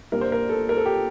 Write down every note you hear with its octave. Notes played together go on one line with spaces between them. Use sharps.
A#2 G3 D4 A#4
C5
A#4
A4
A#4
A4
G4